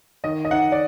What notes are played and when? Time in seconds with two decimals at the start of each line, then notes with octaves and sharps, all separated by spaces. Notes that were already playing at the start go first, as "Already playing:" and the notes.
0.24 D#3 D#5
0.45 D#5
0.51 D#4 F#5
0.72 D5